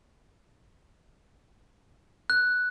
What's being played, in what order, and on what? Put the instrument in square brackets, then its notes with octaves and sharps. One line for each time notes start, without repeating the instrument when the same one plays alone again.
[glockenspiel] F#6